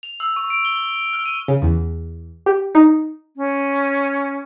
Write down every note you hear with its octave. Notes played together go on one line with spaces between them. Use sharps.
F7
E6
C#6
D7
G7
F6
D#7
C#3
E2
G4
D#4
C#4